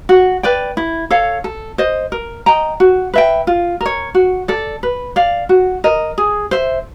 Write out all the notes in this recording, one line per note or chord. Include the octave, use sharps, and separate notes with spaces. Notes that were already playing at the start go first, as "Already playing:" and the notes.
F#4
B4 D5 G5
E4
A4 C#5 F5
A4
C5 D#5
A#4
D#5 G5 A#5
F#4
B4 E5 G5
F4
A#4
C#5
F#4
A4 D5
B4
D5 F5
F#4
A#4 D#5
G#4
C5 E5